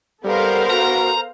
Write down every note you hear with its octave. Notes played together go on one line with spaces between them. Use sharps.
G3 B3 A4 A#4 C5 F5
F#4 A#5